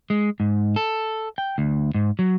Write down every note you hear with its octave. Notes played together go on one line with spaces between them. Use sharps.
G#3
G#2
A4
G5
D2
G#2
F#3